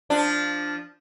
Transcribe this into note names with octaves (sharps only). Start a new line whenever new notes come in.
F3 D4